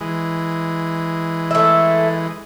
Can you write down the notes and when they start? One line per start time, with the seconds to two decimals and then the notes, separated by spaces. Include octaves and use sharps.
0.01 E3 G#3
1.51 A3 E5